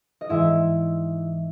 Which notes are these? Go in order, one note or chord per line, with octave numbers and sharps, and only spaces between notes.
D#5
G#2 E3 E4 E5